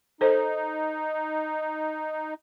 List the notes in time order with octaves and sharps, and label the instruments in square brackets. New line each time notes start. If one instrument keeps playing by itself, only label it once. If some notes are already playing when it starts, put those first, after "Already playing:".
[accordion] D#4 [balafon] A4 C5